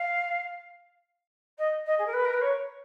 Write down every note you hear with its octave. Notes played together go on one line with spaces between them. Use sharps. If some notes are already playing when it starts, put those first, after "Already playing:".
Already playing: F5
D#5
D#5
G#4
A#4
B4
A#4
B4
C#5